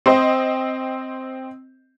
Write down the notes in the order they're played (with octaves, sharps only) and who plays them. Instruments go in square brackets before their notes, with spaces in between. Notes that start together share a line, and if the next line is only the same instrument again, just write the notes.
[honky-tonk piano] C4 C5 D#5